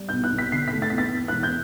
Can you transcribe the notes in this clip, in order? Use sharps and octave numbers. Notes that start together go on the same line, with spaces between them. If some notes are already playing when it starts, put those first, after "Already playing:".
Already playing: G3
B1 G6
F#6
B1
B6
D3 C7
A3 B6
A6
E2 B6
A6
E2
E1 F#6
G6